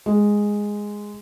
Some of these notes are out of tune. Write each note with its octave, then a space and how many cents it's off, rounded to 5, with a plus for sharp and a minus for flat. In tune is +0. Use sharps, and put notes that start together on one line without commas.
G#3 -5